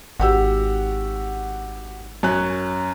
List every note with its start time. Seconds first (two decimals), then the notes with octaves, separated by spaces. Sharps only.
0.20 G#1 F#4 G4 E6
2.23 F#2 C#4 F#6